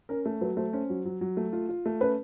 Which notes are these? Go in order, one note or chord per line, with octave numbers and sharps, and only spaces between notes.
C#4 A#4
A3
F#3 B4
A3 C5
C#4 C5
F#3
F#3
F#3
A3
F4
F4
A3
C#4 B4